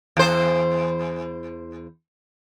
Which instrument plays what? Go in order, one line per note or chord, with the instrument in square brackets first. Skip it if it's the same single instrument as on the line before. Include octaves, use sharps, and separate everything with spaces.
[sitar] E2 C5